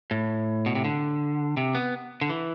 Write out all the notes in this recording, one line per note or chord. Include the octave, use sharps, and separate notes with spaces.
A2
B2
C3
D3
C3
B3
D3
E3